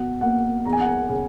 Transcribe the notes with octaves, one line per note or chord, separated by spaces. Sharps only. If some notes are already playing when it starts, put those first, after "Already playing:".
Already playing: B2 F#5
A#3 F#5
E2 A#5
G#5
F#5
G#5
C#3